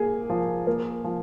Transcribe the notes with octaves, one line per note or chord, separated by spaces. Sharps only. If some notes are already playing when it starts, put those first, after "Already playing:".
Already playing: A#3 G#4
F3
A#3
F3